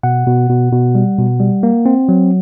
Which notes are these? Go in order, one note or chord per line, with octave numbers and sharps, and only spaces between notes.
B2 F#5
B2
B2
B2
G3
B2
G3
A#3
C4
F#3